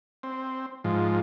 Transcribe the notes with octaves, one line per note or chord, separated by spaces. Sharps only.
C4
G#2 F3